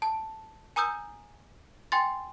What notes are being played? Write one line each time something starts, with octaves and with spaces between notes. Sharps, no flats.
A5
G#5 A#5 D#6 E6 G6
G5 G#5 C6 A6